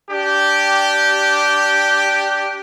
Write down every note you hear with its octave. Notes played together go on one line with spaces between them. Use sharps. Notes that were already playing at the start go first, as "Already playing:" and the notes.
D4 G4